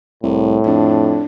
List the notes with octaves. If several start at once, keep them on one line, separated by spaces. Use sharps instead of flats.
C2 A2
F2 D4